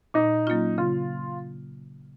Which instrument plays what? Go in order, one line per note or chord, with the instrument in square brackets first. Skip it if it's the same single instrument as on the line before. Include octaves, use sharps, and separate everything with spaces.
[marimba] A#2 [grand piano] D#4
[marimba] F#3 A#3 C#4 F4
[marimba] C#3 [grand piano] F4